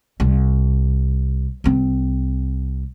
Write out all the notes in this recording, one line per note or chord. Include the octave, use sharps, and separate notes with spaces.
C2
C2 C4